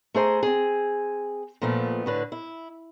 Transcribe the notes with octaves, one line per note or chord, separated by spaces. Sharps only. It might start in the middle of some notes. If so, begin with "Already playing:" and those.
A3 G#4 C5 A#5
C4 G#4
A#2 F3 A3 B3
A2 D3 B4
E4